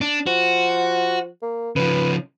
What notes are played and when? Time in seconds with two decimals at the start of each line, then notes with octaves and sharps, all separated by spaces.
0.01 D4
0.27 F3 F#4
1.42 A#3
1.76 C#3 F3 B4